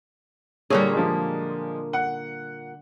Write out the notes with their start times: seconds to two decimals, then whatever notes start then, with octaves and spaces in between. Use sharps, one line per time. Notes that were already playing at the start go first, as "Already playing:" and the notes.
0.70 A#2 D3 G3 A#3 G#4 C#5
0.93 F3 G#3
1.93 F#5